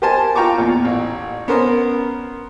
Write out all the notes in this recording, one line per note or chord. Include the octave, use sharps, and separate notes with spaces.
G4 A#4 C5 G#5 A5
F4 G5 A#5 C#6 D6
E2 A#2
A1
B3 C#4 A#4 C5